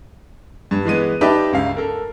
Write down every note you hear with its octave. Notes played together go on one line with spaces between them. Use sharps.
G2
E3 G#3 B3 D#7
D#4 G4 B4 D5 E5 A5
G1 C#2 F5
A4 A#4